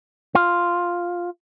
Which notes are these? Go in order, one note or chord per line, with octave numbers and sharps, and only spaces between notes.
F4